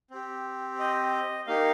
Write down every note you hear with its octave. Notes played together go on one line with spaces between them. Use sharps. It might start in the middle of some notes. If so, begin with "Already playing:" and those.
C4 G4
D#5
A#3 D#4 G4 F5